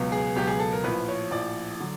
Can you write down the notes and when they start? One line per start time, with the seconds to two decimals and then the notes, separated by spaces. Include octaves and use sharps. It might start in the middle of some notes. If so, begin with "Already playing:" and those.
Already playing: C#2 B2 F#3 B3
0.12 G#4
0.35 C#2 B2 F#3 B3 G4
0.47 G#4
0.60 A4
0.72 A#4
0.84 A#1 A2 F3 B4
1.08 C#5
1.31 A#1 A2 F3 D5
1.80 D3 F#3